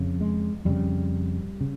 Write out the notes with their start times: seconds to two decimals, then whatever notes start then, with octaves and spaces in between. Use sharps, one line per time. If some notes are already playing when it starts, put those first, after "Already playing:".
Already playing: F2 C#3
0.21 G#3
0.65 F2 C#3 G3
1.61 C#3